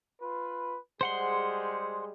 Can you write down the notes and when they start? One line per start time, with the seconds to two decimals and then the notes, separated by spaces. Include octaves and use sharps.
0.21 F4 B4
1.01 G3 G#3 G#4 C5 F#5 C6